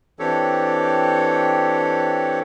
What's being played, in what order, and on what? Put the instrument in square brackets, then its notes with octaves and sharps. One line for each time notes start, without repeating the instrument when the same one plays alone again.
[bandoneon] E3 C4 D4 G4 A4 C#5